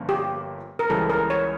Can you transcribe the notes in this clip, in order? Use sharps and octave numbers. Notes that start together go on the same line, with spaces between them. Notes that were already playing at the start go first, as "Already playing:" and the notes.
Already playing: G1 G2 F3 A#3 C#4
G4
A#4
C#2 C#3 E3 G3 A4
A#4
C#5